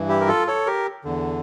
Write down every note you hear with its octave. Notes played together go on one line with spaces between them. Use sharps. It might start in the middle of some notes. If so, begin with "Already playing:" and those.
Already playing: G2 E3
E4 G4
A#4
F4 A4
A4 C#5
G4 A#4
E2 D3